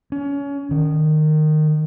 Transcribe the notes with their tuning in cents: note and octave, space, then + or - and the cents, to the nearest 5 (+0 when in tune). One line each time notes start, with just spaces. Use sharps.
C#4 +30
D#3 -15